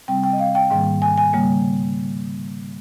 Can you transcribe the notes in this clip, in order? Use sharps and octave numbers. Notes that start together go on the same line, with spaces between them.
C3 G3 C4 G5
G5
D#5
F5
G5
G#2 D#3 G3 A#3 G5
G#5
G#5
C#3 G3 A#3